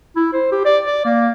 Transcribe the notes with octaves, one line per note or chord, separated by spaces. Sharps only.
E4
C5
G4
D5
D5
A#3